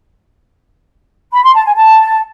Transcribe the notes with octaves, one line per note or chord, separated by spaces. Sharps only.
B5
C6
A5
G#5
A5